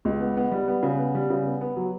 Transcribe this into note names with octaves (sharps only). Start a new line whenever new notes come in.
C#2
B3
B3
G3
B3
C#3
B3
G3
C#3
B3
B3
F#3